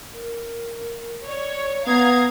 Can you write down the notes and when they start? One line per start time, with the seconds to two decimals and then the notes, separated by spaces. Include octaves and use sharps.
0.13 A#4
1.27 C#5 D5
1.87 B3 F5 A#5 D#6 G#6